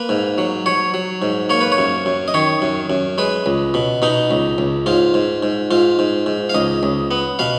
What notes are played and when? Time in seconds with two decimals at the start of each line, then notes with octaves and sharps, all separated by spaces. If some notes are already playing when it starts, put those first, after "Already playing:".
Already playing: A#3 B4
0.09 G#2
0.38 F#3
0.66 F#3 C#5
0.94 F#3
1.22 G#2
1.49 A#3 C#5
1.61 B4
1.72 C#5
1.78 F#2
2.06 F#2
2.28 D#5
2.34 D#3 C#5
2.62 F#2
2.90 F#2
3.18 G#3 B4
3.46 C#2
3.74 B2
4.02 B2 D#4
4.31 C#2
4.58 C#2
4.86 G#2 F4
5.14 G#2
5.43 G#2
5.71 G#2 F4
5.99 G#2
6.26 G#2
6.49 F5
6.54 C#2 D#5
6.83 C#2
7.11 B3
7.39 B2 F5